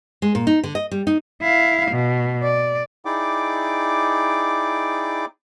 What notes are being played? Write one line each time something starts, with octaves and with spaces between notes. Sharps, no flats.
G#3
A#2
D#4
D3
D#5
G3
D#4
E4 F5
B2
D5
D#4 E4 G#4 D5 G5 D6